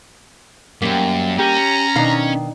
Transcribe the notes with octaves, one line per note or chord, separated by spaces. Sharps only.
F#2 G3 A#3
C#4 G4 A#5
B2 D#3 D4 D#4 F5